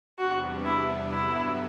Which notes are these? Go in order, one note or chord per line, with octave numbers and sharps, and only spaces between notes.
E2 C3 G3 B3 D4 F#4
E4
G2 D3 F#3 B3 E4